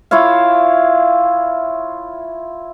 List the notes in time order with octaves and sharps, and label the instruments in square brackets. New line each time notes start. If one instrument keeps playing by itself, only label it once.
[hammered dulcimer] E4 F4 C#5 F5